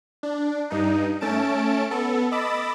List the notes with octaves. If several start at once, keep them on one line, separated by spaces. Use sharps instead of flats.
D4
G2 D#4
A3 C#4 A5 D7
B3 A4
D#5 B5 D6 E6 A6